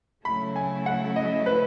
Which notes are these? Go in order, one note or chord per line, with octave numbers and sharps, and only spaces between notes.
C#3 F#3 A3 E4 B5
G#5
F#5
D#5
B4